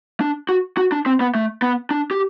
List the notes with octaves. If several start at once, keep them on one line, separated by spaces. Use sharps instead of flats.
D4
F#4
F#4
D4
C4
B3
A3
B3
D4
G4